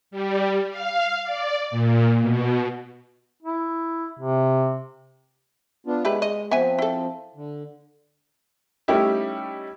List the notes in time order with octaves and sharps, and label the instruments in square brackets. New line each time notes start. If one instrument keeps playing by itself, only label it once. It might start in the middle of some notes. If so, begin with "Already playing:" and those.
[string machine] G3
F5
D5
A#2
B2
[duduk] E4
C3
[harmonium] B3 D4 F4
[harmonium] G#3 [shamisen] E4 G4 B4
[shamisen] D#5
[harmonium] F3 C4 [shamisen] B3 E5 G#5
[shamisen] E4 A4
[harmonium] D3
[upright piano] G3 A3 C#4 D#4 E4 G4